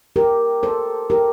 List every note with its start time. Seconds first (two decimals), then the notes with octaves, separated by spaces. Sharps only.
0.16 G4 A#4
0.63 A4 C5
1.10 G4 A#4